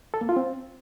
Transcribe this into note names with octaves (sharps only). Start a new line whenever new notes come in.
A4
A#3
F4
C4